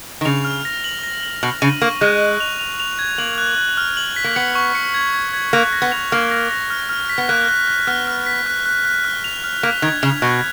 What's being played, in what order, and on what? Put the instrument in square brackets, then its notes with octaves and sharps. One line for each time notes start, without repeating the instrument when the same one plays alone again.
[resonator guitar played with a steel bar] D#3
[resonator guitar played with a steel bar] C#3 [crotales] F7
[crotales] F6
A#6
F#7
A#6
F#7
[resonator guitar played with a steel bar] B2 [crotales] F#7
[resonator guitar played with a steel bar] C#3 [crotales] D#7
[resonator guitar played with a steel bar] A#3 [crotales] C#6
[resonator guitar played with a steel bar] G#3 [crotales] F#6
[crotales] F#6
F7
F7
F7
G#6
[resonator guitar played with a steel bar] A#3 [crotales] F#7
[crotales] F#6
F#6
F6
F#7
B6
[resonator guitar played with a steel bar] A#3
[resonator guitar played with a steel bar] B3 [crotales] C#7
[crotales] C#6
C#7
G#6
G#6
G#6
[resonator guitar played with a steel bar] A#3 [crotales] F#6
[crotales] A#6
[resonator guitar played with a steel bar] B3
[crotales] F7
[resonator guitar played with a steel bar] A#3 [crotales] F6
[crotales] A#6
A#6
F6
F6
B6
[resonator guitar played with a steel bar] B3
[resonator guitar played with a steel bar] A#3 [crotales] F#6
[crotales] F#6
F#6
[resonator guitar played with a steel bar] B3 [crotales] F6
[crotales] F6
B6
F#6
F#6
F#6
F6
F7
F6
[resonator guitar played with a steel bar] A#3 [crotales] B6
[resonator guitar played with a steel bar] D#3 [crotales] G#6
[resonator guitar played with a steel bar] C#3 [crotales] F7
[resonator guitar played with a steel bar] B2 [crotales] F#6